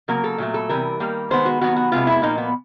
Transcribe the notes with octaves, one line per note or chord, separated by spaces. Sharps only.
C#3 F#3 A#3 A#4
A4
A#2 F#3 A3
A4
C3 E3 G3 A#4
D#3 G3 A#3
D#3 G#3 B3 C5
F#4
D#3 F#3 B3 F#4
F#4
C3 F3 G#3 B3 F4
E4
A#2 F3 A#3 D#4
B3